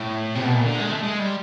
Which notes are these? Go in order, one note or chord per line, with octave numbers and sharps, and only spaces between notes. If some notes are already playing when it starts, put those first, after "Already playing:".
Already playing: A2
C3
B2
A#2
D3
G#3
A3
G#3
G3